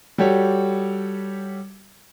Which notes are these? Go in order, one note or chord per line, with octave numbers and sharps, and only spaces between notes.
G3 F#4 G4 A4 C#5